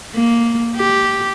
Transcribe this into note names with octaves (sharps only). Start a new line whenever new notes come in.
A#3
G4